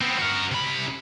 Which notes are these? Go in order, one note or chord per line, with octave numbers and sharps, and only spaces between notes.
B3 C4
F#4 A#4
C3 B5